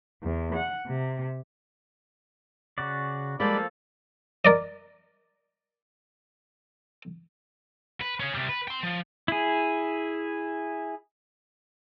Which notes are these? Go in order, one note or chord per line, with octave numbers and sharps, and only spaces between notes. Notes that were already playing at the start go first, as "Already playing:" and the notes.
E2
F#5
C3
C#3 F#4 D5
F3 G3 G#3 A#3 A4 D5 B5
A#4 D5 D#5
B4
C#4 G#4
C3 G3
B4
G5 C6
F3
E4 G#4